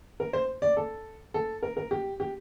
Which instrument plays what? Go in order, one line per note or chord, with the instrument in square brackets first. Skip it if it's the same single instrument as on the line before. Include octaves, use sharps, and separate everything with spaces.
[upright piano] A#4
C5
D5
A4
A4
A#4
A#4
G4
G4